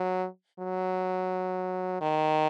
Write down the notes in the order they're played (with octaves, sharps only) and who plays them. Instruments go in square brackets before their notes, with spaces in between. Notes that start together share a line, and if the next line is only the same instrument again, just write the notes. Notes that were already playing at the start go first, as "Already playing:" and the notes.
Already playing: [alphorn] F#3
F#3
D#3